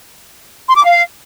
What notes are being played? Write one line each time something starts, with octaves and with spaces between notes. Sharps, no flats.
C6
D6
F5